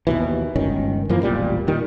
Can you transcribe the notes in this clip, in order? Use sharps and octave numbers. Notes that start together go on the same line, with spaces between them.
D#2 B2 E3
G1 C#2 D#3 C#4
F#2 E3 F3 A#3
E1 A1 A#2 G3
A#2 D#3 G3